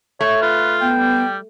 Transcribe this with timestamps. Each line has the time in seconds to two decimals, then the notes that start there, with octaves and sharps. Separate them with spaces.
0.21 A3 C#5
0.42 F4 B4
0.81 B3 G5
0.99 G3